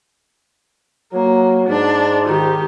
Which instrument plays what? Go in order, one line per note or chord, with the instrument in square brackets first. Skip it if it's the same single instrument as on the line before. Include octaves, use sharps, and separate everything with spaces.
[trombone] F#3 [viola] A#3
[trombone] G#2 [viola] D4
[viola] D#3 G4